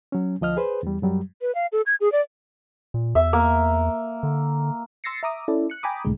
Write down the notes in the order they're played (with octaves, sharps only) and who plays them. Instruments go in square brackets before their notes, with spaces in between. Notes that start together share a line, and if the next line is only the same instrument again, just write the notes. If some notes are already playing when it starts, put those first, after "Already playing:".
[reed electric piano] F#3 C#4
D2 F3 D#5 F6
G#4 B4 C5
E2 G3
F#2 F#3 G3
[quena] B4
F5
A4
G#6
G#4
D5
[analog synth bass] A#2
[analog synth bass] E2 [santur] E5
[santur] A#3
[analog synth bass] D3
[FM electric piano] C6 E6 A6 A#6 C7 C#7
E5 A#5 D6 D#6
C#4 E4 A4 D5
F#6 C#7
G5 G#5 A#5 B5 D6 D#6
C2 A2 D3 G#3